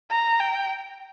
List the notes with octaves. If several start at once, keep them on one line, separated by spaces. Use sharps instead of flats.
A#5
G5